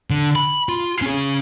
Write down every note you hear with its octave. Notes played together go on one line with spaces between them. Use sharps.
D3
B5
F4
C#4 G#4